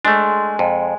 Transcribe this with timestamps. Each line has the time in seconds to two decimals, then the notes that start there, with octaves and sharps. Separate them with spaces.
0.05 G#3 A3 D4
0.59 F2